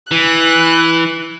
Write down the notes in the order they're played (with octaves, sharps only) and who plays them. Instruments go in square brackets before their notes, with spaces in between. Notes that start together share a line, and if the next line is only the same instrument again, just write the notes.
[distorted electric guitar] E3 [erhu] F#6